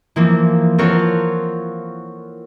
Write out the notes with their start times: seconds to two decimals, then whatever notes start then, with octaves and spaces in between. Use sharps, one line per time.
0.16 E3 F3 A#3 C4
0.78 C4 F4 A4 A#4 C#5 F#5